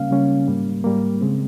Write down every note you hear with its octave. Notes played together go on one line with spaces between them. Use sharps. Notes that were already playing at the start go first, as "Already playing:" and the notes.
Already playing: C#3 G3 A#3 C#4 F5
C#3 G3 A#3 C#4
G#2 G3 A#3
G#2 G3 A#3
C#3 G#3 C4